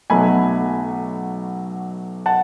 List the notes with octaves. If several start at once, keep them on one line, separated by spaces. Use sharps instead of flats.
B1 B2 F#3 A3 G#5 B5
F#5 A5